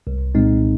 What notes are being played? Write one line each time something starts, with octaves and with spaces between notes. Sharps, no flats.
C2
A#2 G#3 C4 D#4